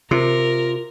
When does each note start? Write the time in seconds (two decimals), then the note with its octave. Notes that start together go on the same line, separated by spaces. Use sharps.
0.11 C3 F4 A#4